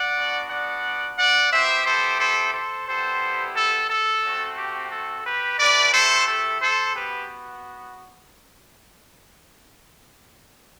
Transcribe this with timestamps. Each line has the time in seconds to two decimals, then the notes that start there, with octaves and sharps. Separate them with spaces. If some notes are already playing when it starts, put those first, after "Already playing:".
Already playing: D5 F#5
0.17 B3 D4 F#4
0.50 D5 F#5
1.19 D5 F#5
1.52 B3 E4 G4 C5 E5
1.86 A4 C5
2.20 A4 C5
2.54 A4 C5
2.88 G3 B3 E4 G4 A4 C5
3.56 A4
3.90 A4
4.24 A3 C4 F#4
4.58 G4
4.92 A4
5.26 G4 B4
5.59 A3 E4 G4 B4 D5
5.93 A4 C5
6.28 A4
6.61 A4 C5
6.95 B3 F#4 G4 B4